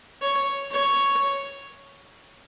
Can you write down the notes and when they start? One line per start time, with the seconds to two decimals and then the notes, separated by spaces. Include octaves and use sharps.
0.22 C#5
0.72 C#5